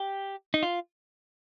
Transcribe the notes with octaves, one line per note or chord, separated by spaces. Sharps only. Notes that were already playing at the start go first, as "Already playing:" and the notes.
Already playing: G4
D#4
F4